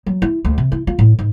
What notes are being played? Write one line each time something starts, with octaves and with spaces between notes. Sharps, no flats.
F#3
E4
D2
C3
E4
F4
A2
G#2